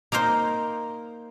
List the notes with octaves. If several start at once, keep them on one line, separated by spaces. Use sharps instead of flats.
A#3 D#4 A#4 C5